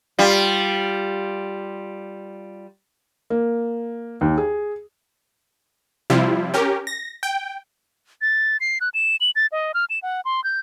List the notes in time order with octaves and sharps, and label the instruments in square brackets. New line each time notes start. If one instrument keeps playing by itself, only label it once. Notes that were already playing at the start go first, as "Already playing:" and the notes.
[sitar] G3 F4
[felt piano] A#3
D#2
G#4
[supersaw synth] C3 F3 G3 E4 F4
C#4 G4 A#4
A#6
G5
[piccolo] A6
C7
F#6
E7
F#7
A6
D#5
F6
E7
F#5
C6
G6